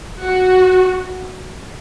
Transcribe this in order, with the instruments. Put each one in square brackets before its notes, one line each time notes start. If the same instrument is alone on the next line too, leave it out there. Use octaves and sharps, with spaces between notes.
[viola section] F#4